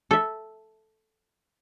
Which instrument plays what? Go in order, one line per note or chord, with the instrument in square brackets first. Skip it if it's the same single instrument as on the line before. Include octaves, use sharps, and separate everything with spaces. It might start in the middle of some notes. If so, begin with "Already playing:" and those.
[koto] A4 E5